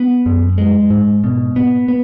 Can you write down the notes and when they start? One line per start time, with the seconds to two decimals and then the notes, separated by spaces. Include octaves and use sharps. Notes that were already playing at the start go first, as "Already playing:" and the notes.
Already playing: B3
0.26 F#2
0.58 G#3
0.90 G#2
1.24 B2
1.56 B3
1.88 B3